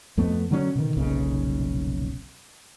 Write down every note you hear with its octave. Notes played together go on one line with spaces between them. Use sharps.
F2 A3 B3
D3 F#3 A#3 C#4
B2 D3 D#3
F1 B1 A#2 C#3